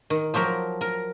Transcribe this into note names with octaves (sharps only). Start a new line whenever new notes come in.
D#3
F3 F#3 G4 A#4
A#4